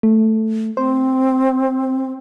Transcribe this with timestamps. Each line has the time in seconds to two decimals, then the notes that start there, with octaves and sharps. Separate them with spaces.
0.03 A3
0.77 C4 C5